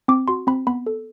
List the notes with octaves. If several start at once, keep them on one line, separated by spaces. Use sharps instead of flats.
C4 D6
F#4 C6
C4 B5
B3 B5
A4